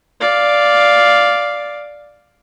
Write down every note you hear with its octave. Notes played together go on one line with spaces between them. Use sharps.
D5 F5